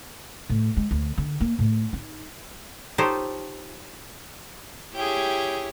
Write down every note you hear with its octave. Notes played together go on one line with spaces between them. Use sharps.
A2
G#3
D2
D3
A#3
A2
D#4
D#4 F4 G4 A4 C5 C#5
E4 G4 G#4 C#5 G5